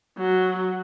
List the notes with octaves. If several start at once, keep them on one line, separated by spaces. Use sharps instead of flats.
F#3